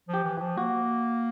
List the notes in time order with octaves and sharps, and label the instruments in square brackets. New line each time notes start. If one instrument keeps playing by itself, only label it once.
[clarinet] F3
[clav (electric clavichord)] G4
[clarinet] E3
F3
[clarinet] A#3 [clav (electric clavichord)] F#4